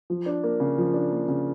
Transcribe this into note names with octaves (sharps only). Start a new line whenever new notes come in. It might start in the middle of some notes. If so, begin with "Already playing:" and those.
F3
D4
A#3
C#3
F3
D4
A#3
C#3